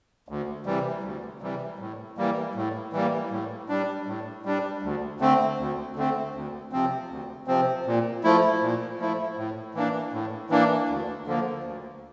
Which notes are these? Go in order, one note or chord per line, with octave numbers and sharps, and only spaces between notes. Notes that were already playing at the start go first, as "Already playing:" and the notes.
D2
C3 E3 G3
D2
C3 E3 G3
A2
E3 G3 A#3
A2
E3 G3 A#3
A2
G3 D4
A2
G3 D4
D2
D3 A3 C4
D2
D3 A3 C4
D2
C3 F3 C4
D2
C3 F3 C4
A#2
F3 A3 E4
A#2
F3 A3 E4
A2
E3 A#3 D4
A2
E3 A#3 D4
D2
D3 F3 A#3
D2